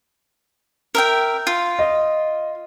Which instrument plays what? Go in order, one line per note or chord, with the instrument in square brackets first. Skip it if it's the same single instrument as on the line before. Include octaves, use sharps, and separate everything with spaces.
[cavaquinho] A#4 E5 G5
F4
[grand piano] D#5